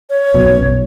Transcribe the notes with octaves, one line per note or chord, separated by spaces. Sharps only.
C#5
B1 F#2 B2
B1